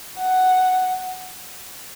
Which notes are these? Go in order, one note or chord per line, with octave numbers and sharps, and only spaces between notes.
F#5